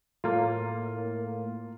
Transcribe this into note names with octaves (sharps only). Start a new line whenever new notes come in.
A2 A#3 F4